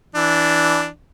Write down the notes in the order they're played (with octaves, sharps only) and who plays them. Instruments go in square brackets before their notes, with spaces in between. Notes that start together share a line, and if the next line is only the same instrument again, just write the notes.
[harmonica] E3 D4